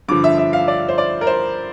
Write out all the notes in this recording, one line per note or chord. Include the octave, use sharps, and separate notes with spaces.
G2 D3 F3 D6
E5
E5
F5
D5
C5
D5
A#4
C5